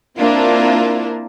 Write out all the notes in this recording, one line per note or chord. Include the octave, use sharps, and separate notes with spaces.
A#3 C4 D4 E4 F4 A#4